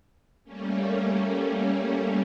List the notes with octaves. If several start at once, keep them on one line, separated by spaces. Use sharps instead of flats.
G3 A3 A#3 C#4